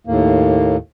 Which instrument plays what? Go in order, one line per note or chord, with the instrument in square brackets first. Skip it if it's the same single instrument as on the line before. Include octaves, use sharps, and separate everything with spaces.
[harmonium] D#2 A2 A#3